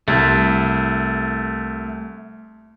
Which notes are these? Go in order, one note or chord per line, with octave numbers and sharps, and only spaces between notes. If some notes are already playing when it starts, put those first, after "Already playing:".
C2 A3